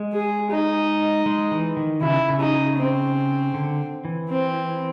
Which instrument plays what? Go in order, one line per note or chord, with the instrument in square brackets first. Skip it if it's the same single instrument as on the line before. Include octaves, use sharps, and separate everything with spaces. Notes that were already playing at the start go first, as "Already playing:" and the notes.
Already playing: [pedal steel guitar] G#3
[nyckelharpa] G#4
D#4
[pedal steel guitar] G#3
E3
D#3
[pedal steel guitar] C#3 [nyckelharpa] E4
[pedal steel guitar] C#3
[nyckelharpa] D#4
C4
[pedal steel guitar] D3
E3
[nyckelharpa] C4